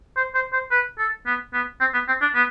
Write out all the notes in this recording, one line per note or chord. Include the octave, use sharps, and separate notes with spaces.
C5
C5
C5
B4
A4
B3
B3
C4
B3
C4
D4
B3